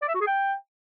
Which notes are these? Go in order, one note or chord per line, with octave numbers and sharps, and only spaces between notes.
D5
E5
F#4
G#4
G5